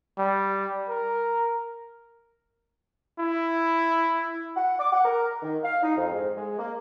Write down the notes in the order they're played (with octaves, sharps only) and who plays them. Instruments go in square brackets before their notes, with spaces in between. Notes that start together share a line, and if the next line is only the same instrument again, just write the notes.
[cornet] G3
A#4
[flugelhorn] E4
[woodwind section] F#5
D6
F#5
A#4
D#3
F5
D#4
F2
G#2
G#3
A#3